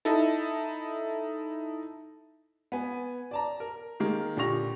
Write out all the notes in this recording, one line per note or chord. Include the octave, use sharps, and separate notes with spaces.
D#4 E4 A4
B3 G#5
D5 A5 A#5
A#4
D#3 G#3 A#3
A#2 D3 G4 C#6 A#6 F7